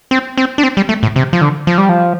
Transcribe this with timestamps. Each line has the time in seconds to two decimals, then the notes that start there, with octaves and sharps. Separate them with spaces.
0.11 C4
0.37 C4
0.58 D4
0.63 C4
0.77 G3
0.89 A3
1.03 A2
1.16 C3
1.33 F3
1.41 D3
1.67 F3
1.78 G3
1.89 F3